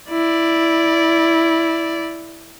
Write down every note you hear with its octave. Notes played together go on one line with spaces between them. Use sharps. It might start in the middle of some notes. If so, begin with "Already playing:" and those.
E4 D5